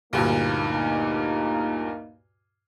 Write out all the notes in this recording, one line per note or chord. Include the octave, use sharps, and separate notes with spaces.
D2 G2 A#2 A#3 D#4